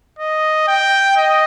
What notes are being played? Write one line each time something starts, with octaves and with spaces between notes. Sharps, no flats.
D#5
G5
D#5